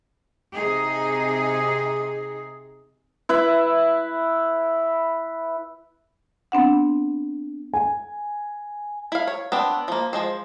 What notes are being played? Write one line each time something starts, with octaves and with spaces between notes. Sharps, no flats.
C3 D#4 G#4
E4 B4 E5
B3 C4 D4 F#5
G#5
E4 F5
C#5
B3 C4 D4
F3 A#3
F3 G#3 C5